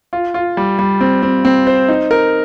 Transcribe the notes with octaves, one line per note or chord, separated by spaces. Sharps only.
F4
F4
G3
G3
C4
C4
C4
C5
D#4
A#4